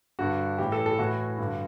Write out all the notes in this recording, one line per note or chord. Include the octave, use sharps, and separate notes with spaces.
G2 D3 F#4
A2 E3 G4
A4
A4
A2 E3 F#4
G2 D3